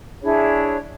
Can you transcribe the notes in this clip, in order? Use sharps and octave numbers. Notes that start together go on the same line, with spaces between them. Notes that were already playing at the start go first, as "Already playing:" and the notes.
D4 E4 G#4 C#5